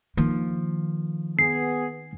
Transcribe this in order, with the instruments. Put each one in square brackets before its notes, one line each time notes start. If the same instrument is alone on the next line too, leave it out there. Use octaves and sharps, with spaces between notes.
[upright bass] D#3 A#3 [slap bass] F3
[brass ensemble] B3 G#4 [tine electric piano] C7